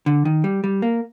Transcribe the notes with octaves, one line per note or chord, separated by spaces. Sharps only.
D3
D#3
G3
G3
A#3